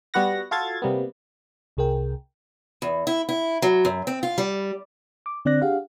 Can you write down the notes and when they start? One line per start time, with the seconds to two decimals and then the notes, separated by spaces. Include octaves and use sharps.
0.14 G3 B3 F#4 B4 F#5 A#6
0.51 F4 F#4 A4 F5 G#6 A6
0.82 C3 G3 A#3 B3
1.77 C2 C3 G#4 A#4 G5
2.82 E2
3.07 E4
3.29 E4
3.62 F#3
3.85 F#2
4.07 C4
4.23 F4
4.38 G3
5.26 D6
5.45 D3 C4 D4 D5 F#6 A#6
5.61 D4 G4 G#4 F5 F#5